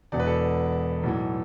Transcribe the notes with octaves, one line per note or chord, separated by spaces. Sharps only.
E1 E2 B2 D5
B4
A4 D5
B1 A2 E3